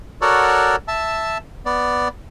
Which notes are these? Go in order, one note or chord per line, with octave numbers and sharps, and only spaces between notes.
F#4 A4 A#4 C#5 D5 F#5
E5 A5
B3 D5